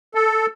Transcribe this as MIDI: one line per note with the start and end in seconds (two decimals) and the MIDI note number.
0.15 0.46 69